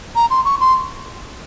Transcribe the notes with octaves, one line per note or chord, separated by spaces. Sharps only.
A#5
C6
C#6
C6